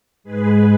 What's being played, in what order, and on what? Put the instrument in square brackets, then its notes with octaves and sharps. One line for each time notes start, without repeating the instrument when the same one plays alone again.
[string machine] G#2 G#3 G#4 B4